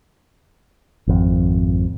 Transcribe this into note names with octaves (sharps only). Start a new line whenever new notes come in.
G#1 F2